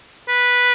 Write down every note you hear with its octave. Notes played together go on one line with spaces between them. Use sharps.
B4